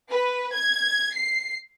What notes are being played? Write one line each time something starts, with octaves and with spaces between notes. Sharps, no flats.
B4
G#6
C7